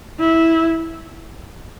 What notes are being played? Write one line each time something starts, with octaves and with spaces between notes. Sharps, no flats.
E4